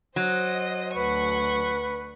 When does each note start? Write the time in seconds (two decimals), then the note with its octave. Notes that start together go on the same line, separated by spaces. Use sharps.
0.16 F#3 C5 D#5
0.94 D2 B4 F#5 C#6